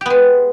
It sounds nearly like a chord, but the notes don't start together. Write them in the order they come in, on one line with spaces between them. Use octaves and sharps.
G4 B3 G#3